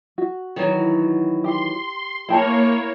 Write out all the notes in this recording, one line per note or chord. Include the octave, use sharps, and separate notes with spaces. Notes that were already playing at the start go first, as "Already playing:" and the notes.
F#4
D#3 E3 F#3
G4 C6
A#3 E4 G#4 C#5 G5 A5